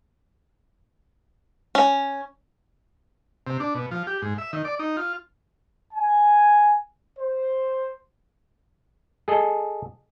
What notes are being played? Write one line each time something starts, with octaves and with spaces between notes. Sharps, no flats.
C#4
C3
D4
B2
F3
G4
G#2
E5
D#3
D5
D#4
F4
G#5
C5
G#4 A4 D#5